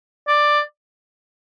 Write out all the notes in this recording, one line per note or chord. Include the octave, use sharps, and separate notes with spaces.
D5